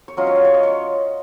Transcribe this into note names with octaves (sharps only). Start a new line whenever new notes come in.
C#5
F#3 C#4 F4 D#5
C#5
F5
C#5
D#5
C#5